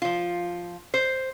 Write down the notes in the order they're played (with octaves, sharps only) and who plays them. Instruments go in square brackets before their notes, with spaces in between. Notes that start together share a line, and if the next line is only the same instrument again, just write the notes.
[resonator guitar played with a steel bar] F3 F4
C5